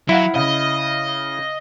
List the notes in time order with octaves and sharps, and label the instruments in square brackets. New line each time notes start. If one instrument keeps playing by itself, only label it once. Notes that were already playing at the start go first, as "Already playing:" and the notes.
[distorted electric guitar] F#3 [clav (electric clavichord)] E4 [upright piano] F5 F#5 B5
[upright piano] C#3 [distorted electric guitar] D#5